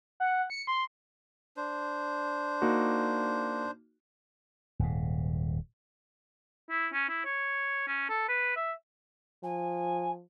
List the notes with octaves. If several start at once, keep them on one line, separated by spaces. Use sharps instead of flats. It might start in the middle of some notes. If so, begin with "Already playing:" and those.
F#5
C#7
C6
D4 C5
A#3 D#4 F#4
D#1 G#2
E4
C#4
E4
C#5
C#4
A4
B4
E5
F3 G#5